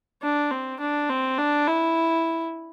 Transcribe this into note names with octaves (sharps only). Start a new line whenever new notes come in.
D4
C4
D4
C4
D4
E4